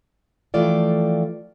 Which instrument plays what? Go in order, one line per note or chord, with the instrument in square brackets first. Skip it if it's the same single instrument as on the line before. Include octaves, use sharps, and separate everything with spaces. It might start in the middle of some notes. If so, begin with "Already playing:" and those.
[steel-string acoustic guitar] E3 F3 A3 F4 D5 G5